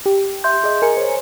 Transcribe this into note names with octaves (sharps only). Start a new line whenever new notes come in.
G4
E5 C6 G6
G#4 D#5
A#4 G#5 C#7
C5 C#5